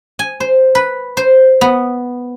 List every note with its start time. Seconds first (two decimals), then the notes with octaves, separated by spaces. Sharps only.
0.19 G#5
0.40 C5
0.75 B4
1.17 C5
1.61 B3